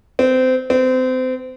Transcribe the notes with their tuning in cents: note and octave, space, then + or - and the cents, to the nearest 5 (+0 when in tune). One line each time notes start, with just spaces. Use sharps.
C4 -25
C4 -30